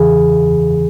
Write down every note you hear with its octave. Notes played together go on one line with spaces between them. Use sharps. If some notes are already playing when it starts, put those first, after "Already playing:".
Already playing: E2 C#3 E3 G#4